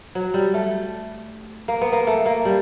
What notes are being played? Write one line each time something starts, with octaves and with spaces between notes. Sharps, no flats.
F#3
G3
A3
A#3
B3
A#3
A3
A#3
G3